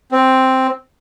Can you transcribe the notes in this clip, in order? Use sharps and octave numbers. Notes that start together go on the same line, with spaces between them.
C4